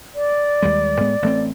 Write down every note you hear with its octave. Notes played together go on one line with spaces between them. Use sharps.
D5
D#2 G3 G#3
A2 G#3 B3
A1 A3 C4